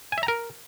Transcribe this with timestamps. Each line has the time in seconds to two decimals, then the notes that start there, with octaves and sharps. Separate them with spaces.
0.12 G#5
0.18 E5
0.23 A#5
0.28 A#4